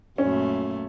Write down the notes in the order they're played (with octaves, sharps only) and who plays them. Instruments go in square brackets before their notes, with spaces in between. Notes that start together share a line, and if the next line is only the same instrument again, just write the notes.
[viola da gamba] F#2 A#2 A3 [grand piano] C#4